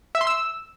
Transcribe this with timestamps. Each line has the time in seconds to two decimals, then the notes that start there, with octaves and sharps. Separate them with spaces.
0.15 E5
0.21 C6
0.27 E6